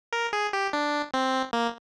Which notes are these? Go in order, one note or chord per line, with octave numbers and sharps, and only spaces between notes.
A#4
G#4
G4
D4
C4
A#3